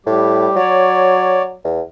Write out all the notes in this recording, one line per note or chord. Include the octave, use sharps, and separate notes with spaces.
A2 G3 G4
F#3 C#5 D5
E2